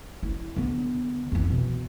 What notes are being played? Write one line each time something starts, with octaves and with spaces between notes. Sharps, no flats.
E4
D3 B3
F2 E3
B2